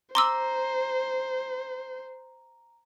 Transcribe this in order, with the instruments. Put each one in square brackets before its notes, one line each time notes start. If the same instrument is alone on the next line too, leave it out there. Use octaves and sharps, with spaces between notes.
[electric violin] C5 [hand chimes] A#5 [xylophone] C6 D6 E6